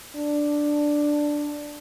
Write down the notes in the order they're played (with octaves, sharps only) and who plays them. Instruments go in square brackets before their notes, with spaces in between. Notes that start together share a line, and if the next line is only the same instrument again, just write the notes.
[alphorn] D4